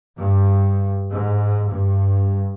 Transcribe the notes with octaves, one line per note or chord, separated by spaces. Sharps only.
G2
G#2
G2